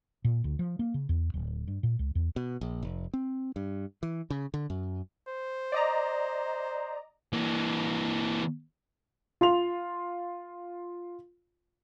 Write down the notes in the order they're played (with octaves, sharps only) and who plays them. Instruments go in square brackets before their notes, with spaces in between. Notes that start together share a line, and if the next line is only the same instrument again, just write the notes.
[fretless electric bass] A#2
D2
F3
A#3
C#3
E2
D1
G2
A#2
C#2
E2
[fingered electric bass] B2
A#1
F1
C4
G2
E3
C#3
D3
F#2
[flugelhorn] C5
[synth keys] D5 D#5 A#5
[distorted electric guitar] E3 A#3
[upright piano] F4 C6 F7